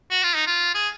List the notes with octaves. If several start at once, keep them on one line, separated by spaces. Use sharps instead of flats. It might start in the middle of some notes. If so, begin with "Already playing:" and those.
F#4
F4
D#4
F4
G#4